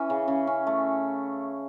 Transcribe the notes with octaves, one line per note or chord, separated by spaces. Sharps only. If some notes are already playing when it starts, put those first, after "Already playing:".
Already playing: E3 C#4
C#3
C#3
C#4
A3